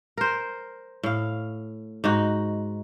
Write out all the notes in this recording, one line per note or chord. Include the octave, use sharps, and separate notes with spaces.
A#4 C5
A2 F5
G#2 D#4 F#4